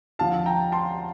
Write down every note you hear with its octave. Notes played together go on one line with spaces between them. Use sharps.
D#2 D3 F3 F5 A5
G5 A#5
A5 C6